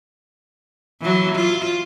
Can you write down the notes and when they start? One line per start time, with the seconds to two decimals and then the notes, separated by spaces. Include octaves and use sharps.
1.01 E3 F#3
1.36 F4